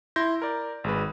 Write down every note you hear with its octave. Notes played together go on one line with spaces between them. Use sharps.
E4 C6 G6 A#6
A#4 D5
G#1 G#3 B4